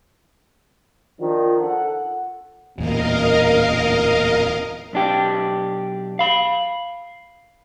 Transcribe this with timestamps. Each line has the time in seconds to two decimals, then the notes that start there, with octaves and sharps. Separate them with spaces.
1.20 D#3 F3 D4 F4
1.62 A4 F#5
2.78 D1 E2 A#2 A#4 D#5 F5
4.93 B1 D4 G4
6.19 F5 B5